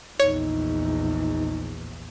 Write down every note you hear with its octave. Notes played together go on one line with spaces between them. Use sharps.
A#1 E2 D#4 C#5